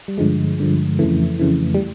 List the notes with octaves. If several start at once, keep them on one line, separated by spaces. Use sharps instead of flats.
G3
G2 D3 F3 G#3
G2 D3 F3
F2 C#3 E3 A3
F2 C#3 E3
G3